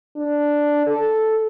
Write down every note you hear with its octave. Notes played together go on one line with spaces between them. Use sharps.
D4
A4